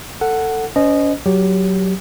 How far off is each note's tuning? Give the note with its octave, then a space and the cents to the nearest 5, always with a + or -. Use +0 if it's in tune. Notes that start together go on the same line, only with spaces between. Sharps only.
A4 +20 F#5 +0
C#4 +35 C5 -35 D#5 -15
F#3 +15 G4 +0